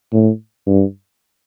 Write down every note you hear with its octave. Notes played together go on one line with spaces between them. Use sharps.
A2
G2